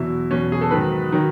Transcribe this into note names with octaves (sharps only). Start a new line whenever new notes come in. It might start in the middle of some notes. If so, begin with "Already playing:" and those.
Already playing: E2 B2 F#3 E4
E2 B2 F#3 C#4
G#4
A4
G#2 D#3 F#3 B4
D#3 F#3